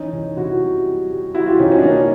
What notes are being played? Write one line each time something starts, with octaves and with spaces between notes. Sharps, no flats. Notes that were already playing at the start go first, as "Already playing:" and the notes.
Already playing: E3 C#4 D#4
C2
C3 E4 F#4
G3
G3
G3
G3 E4 F#4
F4 G4
C2 C#4 D#4
C#4 D#4
D4
A#3 C#4 D#4